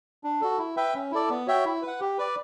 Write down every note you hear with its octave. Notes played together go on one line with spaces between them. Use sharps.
D4
F#4 A4
E4
B4 E5 G5
C#4
E4 A4 D5
B3
F#4 C#5 E5 G5
E4
B4
F#5
G4
B4 D5